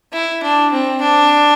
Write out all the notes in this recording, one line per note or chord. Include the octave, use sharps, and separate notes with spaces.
E4
D4
C4
D4